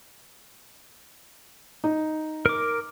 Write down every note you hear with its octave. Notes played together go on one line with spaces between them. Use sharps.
D#4
A#4 D6